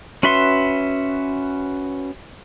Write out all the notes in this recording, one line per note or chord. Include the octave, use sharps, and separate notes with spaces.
C#4 F#4 B4 E5 C6